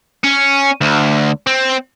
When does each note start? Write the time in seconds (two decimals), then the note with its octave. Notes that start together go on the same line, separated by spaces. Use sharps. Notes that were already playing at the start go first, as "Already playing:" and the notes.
0.24 C#4
0.81 D2
1.47 C4